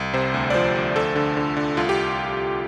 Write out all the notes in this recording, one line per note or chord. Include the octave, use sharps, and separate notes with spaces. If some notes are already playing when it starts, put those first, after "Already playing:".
Already playing: C2
C3 C5
D2
D5
F3 C5
D2
D2 A4
D3
D3
D3
C2 F4
G4